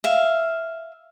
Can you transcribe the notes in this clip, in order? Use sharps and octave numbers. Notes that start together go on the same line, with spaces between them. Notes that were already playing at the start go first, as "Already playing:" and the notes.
E5 F5